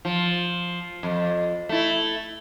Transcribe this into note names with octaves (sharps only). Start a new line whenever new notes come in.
F3
F2
A3 E4